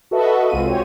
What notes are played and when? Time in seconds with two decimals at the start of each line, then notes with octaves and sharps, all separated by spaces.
0.11 F#4 A4 B4 D#5 E5
0.50 C2 G#3 C4 F4 D#7
0.67 F#4 G4 C5 C#5